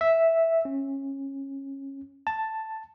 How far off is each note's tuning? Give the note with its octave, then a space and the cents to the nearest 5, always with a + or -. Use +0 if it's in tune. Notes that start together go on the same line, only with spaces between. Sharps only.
E5 -5
C#4 -20
A5 +5